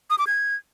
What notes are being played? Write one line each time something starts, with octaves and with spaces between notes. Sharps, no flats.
D#6
D6
G#6